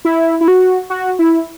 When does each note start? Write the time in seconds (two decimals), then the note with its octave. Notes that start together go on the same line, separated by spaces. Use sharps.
0.05 E4
0.41 E4
0.48 F#4
0.90 F#4
1.19 E4